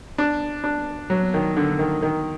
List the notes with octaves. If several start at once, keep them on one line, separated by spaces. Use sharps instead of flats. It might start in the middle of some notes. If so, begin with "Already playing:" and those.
D4
D4
F#3
D#3
D3
D#3
D#3